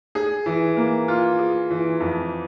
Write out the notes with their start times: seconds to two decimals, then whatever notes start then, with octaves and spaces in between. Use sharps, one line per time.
0.15 G#4
0.46 E3
0.77 A#3
1.08 F4
1.39 G#4
1.70 E3
2.00 F2